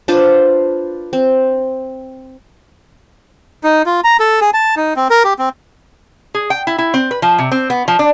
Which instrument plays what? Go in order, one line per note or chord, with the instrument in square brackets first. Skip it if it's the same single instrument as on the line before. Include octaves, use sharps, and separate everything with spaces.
[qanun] D4 F4 B4 C5
C4
[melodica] D#4
F4
A#5
A4
G#4
A5
D#4
C4
A#4
G4
C4
[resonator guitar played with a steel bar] G#4
G5
E4
E4
C4
B4
F3
C3
C4
B3
F3
D4